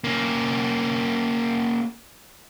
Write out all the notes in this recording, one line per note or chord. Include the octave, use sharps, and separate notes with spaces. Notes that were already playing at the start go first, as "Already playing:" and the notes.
A#3 C#4